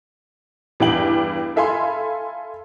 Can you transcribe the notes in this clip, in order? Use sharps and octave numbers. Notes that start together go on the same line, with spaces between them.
E2 G2 G5 F#7
A4 E5 F5 G#5 B5 C6